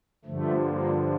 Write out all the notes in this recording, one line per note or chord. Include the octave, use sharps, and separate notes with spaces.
G2 D3 F3 A3
A#3